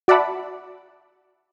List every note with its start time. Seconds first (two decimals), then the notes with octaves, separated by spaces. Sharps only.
0.08 F#4 D5 E5 F#5 A5 B5